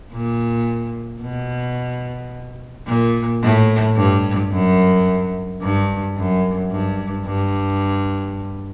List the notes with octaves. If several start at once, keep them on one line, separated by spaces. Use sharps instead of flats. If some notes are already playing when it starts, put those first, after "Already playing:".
A#2
B2
A#2
A2
G2
F#2
G2
F#2
G2
G2